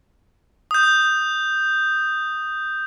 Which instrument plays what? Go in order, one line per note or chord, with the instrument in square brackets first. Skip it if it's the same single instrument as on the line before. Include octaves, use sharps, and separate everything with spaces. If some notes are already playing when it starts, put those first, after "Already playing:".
[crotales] D#6 G6